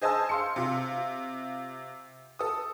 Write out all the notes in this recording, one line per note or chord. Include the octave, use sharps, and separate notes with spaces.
G#4 C5 D#5 G#5 A5 E6
F5 C6 C#7
C3 F4
A4 D#6